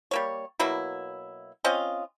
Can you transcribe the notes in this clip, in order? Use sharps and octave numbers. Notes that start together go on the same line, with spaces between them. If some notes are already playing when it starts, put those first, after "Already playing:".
G3 A#3 C#5
B2 F#3 A#3 E4
C4 C#4 F4 D#5